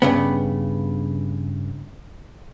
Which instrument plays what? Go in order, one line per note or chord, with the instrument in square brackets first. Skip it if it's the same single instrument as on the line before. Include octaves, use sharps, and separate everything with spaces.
[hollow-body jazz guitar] G2 C#3 B3